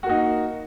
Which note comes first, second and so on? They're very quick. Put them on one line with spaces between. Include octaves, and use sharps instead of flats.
F#4 A#3 D#4